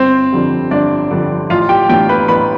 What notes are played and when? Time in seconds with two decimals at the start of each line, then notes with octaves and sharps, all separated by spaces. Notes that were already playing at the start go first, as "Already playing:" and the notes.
Already playing: G1 C4 C5
0.32 F2 D3 G3
0.71 G1 D4 D5
1.11 F2 D3 G3
1.50 A1 F4 F5
1.69 G4 G5
1.89 A2 E3 B3 D4 G4 G5
2.09 B4 B5
2.28 A1 B4 B5